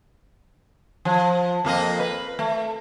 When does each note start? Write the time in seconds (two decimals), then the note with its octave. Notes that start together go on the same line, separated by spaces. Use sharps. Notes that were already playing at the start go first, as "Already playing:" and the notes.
1.05 F3
1.65 F2 A#3 D#5
2.00 B4
2.39 A3